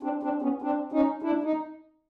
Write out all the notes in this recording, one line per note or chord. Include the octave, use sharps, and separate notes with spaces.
C4 D4
C4 D4
B3 C#4
C4 D4
C#4 D#4
D4 E4
D#4